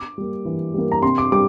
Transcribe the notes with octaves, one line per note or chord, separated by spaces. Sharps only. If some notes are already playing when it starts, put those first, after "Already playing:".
Already playing: D6
G3 A#3
E3
G3 A#3
A#5
C3 C6
D6
G3 D6